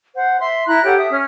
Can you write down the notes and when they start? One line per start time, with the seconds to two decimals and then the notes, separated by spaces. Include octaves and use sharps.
0.14 C5 F#5
0.41 E5 C6
0.67 E4 A#5 B5 F#6
0.84 G4 A4 C#5 F#5
0.97 E5 D#6
1.12 C#4 F6